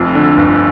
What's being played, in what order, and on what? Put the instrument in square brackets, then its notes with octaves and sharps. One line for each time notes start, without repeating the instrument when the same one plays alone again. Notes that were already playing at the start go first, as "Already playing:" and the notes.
Already playing: [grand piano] F1 F2
D3
G1